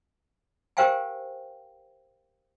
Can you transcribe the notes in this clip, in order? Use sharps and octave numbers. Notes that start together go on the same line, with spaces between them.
G4 A#4 C5 F5 G5 G#5